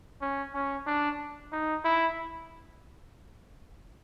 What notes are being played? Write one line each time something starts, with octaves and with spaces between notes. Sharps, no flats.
C#4
C#4
D4
D#4
E4